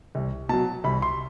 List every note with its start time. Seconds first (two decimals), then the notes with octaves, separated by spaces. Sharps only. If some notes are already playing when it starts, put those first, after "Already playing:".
0.15 C2
0.49 B2 F#3 A5
0.84 C2 B5
1.02 C6